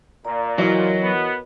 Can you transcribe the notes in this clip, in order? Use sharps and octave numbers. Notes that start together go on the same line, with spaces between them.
A#2 D5 A#5
E3 F#3 F#4 A#4 C#5 D#5
B3